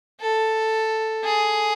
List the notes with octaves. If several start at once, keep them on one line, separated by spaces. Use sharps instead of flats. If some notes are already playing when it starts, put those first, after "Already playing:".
A4
G#4